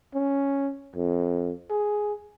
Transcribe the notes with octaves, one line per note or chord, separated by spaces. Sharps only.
C#4
F2
G#4